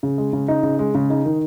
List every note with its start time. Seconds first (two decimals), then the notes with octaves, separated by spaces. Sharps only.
0.03 C#3
0.18 G#3
0.33 C#3
0.48 D#4
0.63 C#3
0.79 G#3
0.95 C#3
1.10 D#4
1.26 D#3